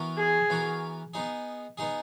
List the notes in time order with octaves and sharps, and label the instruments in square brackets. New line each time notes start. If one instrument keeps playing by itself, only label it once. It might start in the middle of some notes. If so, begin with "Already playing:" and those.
Already playing: [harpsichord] E3 B3 F#4 A#4
[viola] G#4
[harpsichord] E3 B3 F#4 A#4
B3 D#4 G#4
B3 D#4 G#4